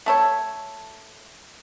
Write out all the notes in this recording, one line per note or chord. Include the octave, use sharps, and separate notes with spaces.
A3 A4 C#5